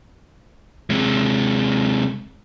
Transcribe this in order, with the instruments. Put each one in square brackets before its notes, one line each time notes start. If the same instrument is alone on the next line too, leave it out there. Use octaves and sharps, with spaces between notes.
[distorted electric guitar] C3 G#3